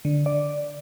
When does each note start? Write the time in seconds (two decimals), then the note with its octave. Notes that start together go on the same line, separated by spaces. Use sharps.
0.05 D3
0.26 D5